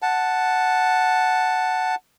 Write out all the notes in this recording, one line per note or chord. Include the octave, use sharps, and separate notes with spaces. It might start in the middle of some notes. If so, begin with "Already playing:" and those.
F#5 A5